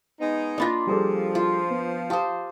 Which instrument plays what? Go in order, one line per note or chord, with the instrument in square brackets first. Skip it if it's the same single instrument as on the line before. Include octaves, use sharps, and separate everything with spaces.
[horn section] G#3 B3 D#4
[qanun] A#3 D4 F4 [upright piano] D#5 B5 A#6
[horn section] F3 [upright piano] G3 G#4 A4
[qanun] F4
[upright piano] B3
[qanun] G4 C5 [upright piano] F5 A5 D#6